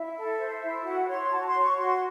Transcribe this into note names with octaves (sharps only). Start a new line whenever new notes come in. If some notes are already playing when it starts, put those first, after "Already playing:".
Already playing: E4 E5
A4
C5
E4
F#4 F#5
C#5 C6
F#4 A5
C6
C#5
C#6
F#4 C6